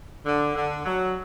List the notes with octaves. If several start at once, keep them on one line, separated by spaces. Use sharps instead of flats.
D3
D3
F#3